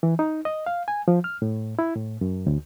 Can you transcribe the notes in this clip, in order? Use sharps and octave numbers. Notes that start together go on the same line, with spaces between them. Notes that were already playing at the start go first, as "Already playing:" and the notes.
E3
D#4
D#5
F5
G#5
F3
F6
A2
E4
A2
F#2
D2